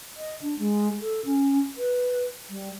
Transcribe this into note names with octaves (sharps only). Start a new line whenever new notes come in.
D#5
D4
G#3
A4
C#4
B4
G3